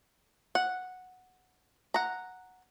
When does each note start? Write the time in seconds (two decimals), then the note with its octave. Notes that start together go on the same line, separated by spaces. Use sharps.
0.55 F#5
1.94 F#5 A#5